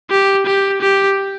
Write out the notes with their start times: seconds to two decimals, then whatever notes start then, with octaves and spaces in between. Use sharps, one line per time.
0.10 G4
0.46 G4
0.81 G4